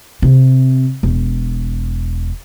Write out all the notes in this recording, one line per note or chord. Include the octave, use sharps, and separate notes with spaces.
C3
E1